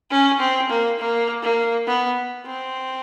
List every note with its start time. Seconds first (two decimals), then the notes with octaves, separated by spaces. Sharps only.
0.11 C#4
0.40 C4
0.70 A#3
0.99 A#3
1.43 A#3
1.88 B3
2.47 C4